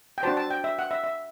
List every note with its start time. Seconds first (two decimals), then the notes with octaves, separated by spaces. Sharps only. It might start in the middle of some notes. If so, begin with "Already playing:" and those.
0.18 G5
0.23 D4 F#4 C5 A5
0.37 A5
0.50 G5
0.64 E5
0.79 F#5
0.91 E5
1.04 E5